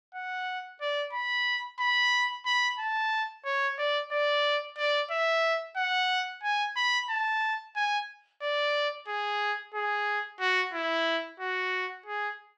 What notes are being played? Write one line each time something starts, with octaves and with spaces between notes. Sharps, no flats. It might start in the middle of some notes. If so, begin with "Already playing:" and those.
F#5
D5
B5
B5
B5
A5
C#5
D5
D5
D5
E5
F#5
G#5
B5
A5
G#5
D5
G#4
G#4
F#4
E4
F#4
G#4